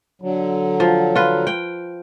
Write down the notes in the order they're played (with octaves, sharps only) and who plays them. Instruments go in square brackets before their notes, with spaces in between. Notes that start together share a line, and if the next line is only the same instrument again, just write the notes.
[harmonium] D3 F#3
[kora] F3
F4 B4
G5